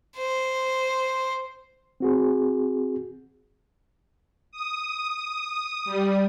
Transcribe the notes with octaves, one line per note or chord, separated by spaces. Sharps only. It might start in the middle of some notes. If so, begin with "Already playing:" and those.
C5
C4 F#4 G#4
D#6
G3